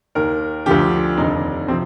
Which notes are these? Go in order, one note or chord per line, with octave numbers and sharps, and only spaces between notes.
D#2 D#3 A#4
D2 D3 F3 G4
F1 D#2 D3 D#4
C3 F3 C4